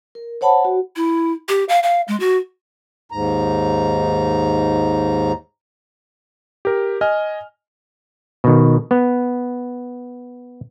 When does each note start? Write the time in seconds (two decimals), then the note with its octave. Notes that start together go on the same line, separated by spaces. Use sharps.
0.15 A#4
0.41 C5 C#5 F#5 A5 B5
0.65 F#4
0.96 E4
1.49 G4
1.69 F5
1.83 F5
2.08 G#3
2.20 F#4
3.12 D#2 G#2 A#5
6.65 G4 A#4
7.01 D#5 G#5 F6
8.44 B2 D#3
8.91 B3